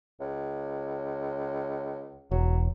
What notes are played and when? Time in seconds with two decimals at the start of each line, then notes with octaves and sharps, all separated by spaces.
0.21 C#2
2.31 E1 F#3